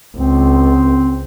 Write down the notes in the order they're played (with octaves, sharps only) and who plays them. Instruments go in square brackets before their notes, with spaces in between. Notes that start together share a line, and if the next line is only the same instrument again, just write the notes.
[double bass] C#2 [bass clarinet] C4